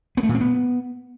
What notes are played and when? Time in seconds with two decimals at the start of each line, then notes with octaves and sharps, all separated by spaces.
0.17 B3
0.23 A3
0.29 A#2
0.35 C4
0.40 B3